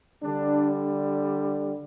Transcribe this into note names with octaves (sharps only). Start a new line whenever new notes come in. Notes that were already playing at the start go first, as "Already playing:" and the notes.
D3 G3 D4